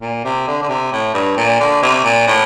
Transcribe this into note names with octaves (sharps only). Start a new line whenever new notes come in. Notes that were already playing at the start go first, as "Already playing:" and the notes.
A#2
C3
D3
D3
C3
A2
G2
A#2
D3
C3
A#2
A2